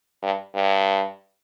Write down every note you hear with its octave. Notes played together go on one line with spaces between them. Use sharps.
G2
G2